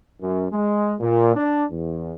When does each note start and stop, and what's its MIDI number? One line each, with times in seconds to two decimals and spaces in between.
0.20 0.46 42
0.52 0.93 56
1.00 1.33 46
1.36 1.64 62
1.70 2.15 40